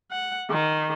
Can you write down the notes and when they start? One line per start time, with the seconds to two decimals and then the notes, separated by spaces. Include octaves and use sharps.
0.11 F#5
0.50 D#3